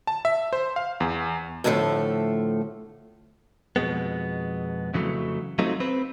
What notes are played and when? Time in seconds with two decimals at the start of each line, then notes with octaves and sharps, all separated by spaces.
0.07 A5
0.25 E5
0.53 C5
0.76 F5
1.00 E2
1.64 A2 D3 F3 G3 A3
3.76 F2 B2 G#3 B3
4.94 F2 C#3 E3 F#3 A3
5.59 F#3 A3 C4 D#4 F4
5.80 C4 B4